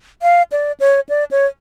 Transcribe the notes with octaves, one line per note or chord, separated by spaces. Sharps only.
F5
D5
C#5
D5
C#5